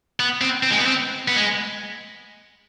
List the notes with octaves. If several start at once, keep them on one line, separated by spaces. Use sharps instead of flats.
B3
C4
C4
G#3
B3
C4
B3
G#3